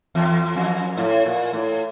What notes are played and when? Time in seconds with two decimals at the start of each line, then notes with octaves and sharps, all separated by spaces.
0.15 E2
0.56 F2
0.97 A2
1.25 A#2
1.53 A2